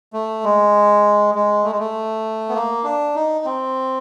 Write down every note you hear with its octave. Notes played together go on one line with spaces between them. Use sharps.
A3
G#3
G#3
A3
G#3
A3
B3
A#3
D4
D#4
C4